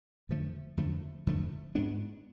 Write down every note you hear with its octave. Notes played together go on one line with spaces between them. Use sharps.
F2 D3 F3 A3
F2 D3 F3 A3
F2 D3 F3 A3
G#2 G#3 B3 D4